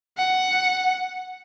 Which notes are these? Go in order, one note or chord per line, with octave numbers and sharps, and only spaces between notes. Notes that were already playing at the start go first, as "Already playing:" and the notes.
F#5